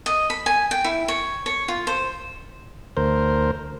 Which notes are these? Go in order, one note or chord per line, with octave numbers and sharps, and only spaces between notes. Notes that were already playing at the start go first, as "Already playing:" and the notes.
D#5
B5
G#5
G5
E4
C#5
C#5
F4
C5
D2 A#4 C5